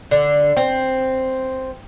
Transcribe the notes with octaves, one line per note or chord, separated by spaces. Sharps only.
D3
C4